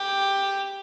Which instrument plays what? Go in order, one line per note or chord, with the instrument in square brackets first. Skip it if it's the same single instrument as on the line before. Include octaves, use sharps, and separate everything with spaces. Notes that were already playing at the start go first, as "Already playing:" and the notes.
Already playing: [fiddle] G4